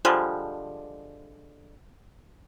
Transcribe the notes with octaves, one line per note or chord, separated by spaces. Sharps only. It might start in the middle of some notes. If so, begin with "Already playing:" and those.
D3 F3 G3 G#3